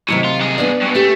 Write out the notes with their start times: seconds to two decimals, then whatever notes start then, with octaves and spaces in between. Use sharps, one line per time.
0.08 A2 C3 D#3 F#3
0.24 F4
0.40 G2 G#4
0.58 B3 D4 D5
0.81 G2 B2
0.95 A3 C#4 G4